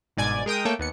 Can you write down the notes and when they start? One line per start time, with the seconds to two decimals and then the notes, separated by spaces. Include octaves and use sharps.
0.17 G1 G#2 B2 D5 G#5 G#6
0.46 G#3 A#4 G5 D#6
0.65 A3 A#3 A4 C#5 G5
0.79 D#2 B3 C#7